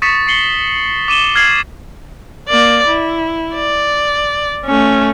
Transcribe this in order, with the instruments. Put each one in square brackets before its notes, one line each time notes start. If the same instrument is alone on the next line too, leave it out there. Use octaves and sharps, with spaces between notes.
[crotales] C#6 D#6 A6 B6 C#7 E7
C#6 C7 C#7 F#7 G7
D6 D#7 E7 G7
F6 G#6 A6 C7 F#7
[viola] A#3 D5
E4
D5
A3 C#4